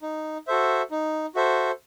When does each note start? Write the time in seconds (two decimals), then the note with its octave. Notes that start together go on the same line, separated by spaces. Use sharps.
0.02 D#4
0.47 F#4 A4 C5 E5
0.91 D#4
1.35 F#4 A4 C5 E5